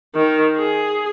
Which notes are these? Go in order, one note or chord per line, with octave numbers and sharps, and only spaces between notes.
D#3
G#4